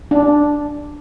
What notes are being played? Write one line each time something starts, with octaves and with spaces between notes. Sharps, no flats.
D4